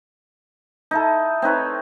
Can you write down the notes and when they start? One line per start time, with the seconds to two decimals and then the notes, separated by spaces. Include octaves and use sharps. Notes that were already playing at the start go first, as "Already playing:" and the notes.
0.91 D#4 E4 A4
1.42 C4 D#4 B4 C#5